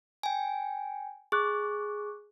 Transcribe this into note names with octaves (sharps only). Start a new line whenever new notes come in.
G5 G#5
G#4 C#6 D6 F#6